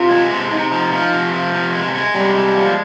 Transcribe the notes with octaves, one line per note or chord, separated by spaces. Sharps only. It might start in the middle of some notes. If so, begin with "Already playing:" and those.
Already playing: C3 F4
G#3
C3
C3 D#4
F3
F3
C3
F3
C3
G#3
G#3
C3 G3
G#3
F3